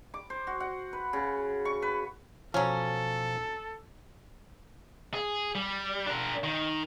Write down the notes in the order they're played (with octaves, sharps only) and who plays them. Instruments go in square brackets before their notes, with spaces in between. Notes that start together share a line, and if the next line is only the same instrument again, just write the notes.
[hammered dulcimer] D6
C5
F#4
F#5
B4
C#3
C#6
B4
[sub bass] B2 [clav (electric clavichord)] F3 [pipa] F#3 C#4 [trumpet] A4
[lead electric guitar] G#4
G3
D4 A#4
D#3